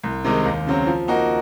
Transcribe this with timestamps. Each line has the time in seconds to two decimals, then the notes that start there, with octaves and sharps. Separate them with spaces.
0.04 C2
0.24 C3 D#3 G#3 D#4
0.45 D#2
0.67 C#3 F#3 C4
0.87 F3
1.08 A#3 D#4 F#4